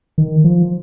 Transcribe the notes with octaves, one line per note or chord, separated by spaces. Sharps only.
D#3
F3